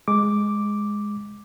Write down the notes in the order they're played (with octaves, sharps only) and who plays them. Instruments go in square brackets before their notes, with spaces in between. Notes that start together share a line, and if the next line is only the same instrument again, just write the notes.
[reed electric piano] G#3 D6